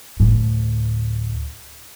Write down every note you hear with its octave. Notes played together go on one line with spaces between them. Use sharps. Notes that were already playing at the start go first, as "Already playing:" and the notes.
D2 A2